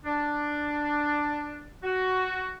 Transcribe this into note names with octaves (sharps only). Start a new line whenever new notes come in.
D4
F#4